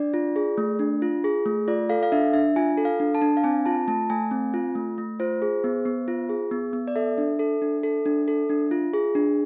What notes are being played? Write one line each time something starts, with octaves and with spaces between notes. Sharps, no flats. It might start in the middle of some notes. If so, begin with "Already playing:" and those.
Already playing: D4 D5
F4
G#4
A3
D4
F4
G#4
A3
F4 D5
A4 F5
F5
D4 E5
D4 E5
F4 G#5
A4
F5
D4
A5
D4
F5
C4 G#5
F4 A5
A3 A5
A3 G#5
C4
F4
A3
A3
F4 C5
G#4
B3
B3
F4
G#4
B3
B3
D5
A4 E5
D4
A4
D4
A4
D4
A4
D4
F4
G#4
D4